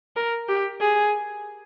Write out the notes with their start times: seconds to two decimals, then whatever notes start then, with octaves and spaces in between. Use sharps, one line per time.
0.16 A#4
0.49 G4
0.81 G#4